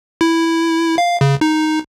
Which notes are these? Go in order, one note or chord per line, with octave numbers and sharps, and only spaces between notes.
E4
F5
C#3
D#4